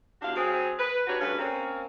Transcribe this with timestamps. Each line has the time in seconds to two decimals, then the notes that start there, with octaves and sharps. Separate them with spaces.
0.21 E2 D4 F#4 G4 F5
0.35 F#3 C4 G#4
0.79 B4
1.07 D4 D#4 F#4 G4 B4 C#5
1.21 D2 G2 C#3 C#4 D4 B4
1.39 A#3 C4 C#4